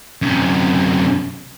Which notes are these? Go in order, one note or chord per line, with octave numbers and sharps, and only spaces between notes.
F#2 C3